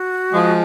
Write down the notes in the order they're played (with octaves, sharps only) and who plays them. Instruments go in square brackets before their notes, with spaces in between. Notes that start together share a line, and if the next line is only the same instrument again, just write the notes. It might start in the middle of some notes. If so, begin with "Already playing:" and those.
Already playing: [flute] F#4
[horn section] F3 G#3